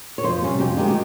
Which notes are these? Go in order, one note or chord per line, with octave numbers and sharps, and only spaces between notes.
C#5
F2 C5
C3 G3 C#4
F2 G4
D#3 G#3 D#4 G4
G4